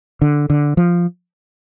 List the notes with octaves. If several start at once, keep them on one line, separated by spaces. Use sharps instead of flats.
D3
D3
F3